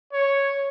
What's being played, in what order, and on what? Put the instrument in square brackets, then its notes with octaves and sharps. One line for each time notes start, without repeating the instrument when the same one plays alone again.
[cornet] C#5